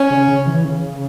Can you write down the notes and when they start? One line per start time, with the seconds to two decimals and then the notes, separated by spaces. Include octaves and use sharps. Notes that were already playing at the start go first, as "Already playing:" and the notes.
Already playing: C#4
0.11 C#3
0.28 C#3
0.47 E3
0.65 C#3